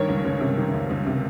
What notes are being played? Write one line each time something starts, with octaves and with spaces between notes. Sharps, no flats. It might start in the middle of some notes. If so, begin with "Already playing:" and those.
Already playing: G2 D#3 A#4 C#5
C#2
C#2
C3
D#3
C#2
C#2
C3